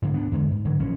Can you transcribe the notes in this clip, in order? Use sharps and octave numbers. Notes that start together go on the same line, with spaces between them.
G#2 D3 F#3 G#3
D2 B3 D4
E2 D3 G#3
G#2
D3 E3 F#3
A#1 E3 F3 C#4